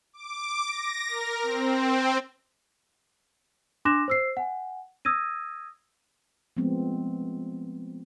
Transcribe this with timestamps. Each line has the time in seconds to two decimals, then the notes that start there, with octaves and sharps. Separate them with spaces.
0.13 D6
0.67 A#6
1.08 A#4
1.43 C4
3.85 D4 C6 D6 F#6 A#6 E7
4.08 C5 E6 C7
4.37 F#5 G#5
5.05 D#6 E6 G#6 A#6 D#7
6.57 F3 G#3 A3 B3 C4